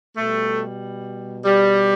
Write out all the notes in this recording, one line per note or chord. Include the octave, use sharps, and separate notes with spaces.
B2 G3 A3
G3